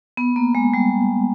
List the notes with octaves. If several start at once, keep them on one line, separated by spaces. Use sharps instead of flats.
B3
A#3
G#3
G3